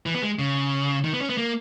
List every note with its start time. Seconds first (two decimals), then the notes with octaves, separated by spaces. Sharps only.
0.06 E3
0.15 B3
0.23 G#3
0.39 C#3
1.04 D#3
1.13 B3
1.21 C#4
1.30 B3
1.37 A#3